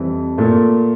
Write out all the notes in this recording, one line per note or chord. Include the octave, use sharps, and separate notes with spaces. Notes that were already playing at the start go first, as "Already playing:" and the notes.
Already playing: F2 E3 G3
A#2 A3